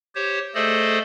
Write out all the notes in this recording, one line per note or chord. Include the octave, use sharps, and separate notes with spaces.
G4 C5 C#5
A3 G#4 A4 C5 D5 D#5